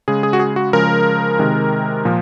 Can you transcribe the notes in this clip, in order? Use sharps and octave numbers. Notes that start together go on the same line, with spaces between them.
C#3 G#3 G#4
G#4
F#4
G#4
F#4
C#3 F3 G#3 A#4
C3 D#3 G#3
A#2 F3